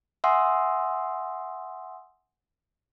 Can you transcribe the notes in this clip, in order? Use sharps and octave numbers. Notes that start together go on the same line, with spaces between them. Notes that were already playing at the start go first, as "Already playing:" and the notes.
E5 F#5 G#5 C6 D#6 E6